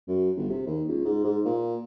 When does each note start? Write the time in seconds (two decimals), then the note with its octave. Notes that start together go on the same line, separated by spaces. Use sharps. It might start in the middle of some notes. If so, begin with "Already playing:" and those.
0.08 F#2
0.37 G1
0.50 C3
0.66 D#2
0.88 C#2
1.05 G#2
1.24 G#2
1.45 A#2